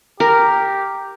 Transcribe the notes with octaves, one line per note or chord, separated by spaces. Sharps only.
G4 A#4